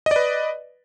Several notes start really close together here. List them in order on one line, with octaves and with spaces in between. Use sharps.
D#5 D5 B4